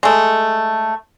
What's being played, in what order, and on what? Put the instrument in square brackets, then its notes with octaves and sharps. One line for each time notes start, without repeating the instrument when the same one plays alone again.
[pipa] G#3 A3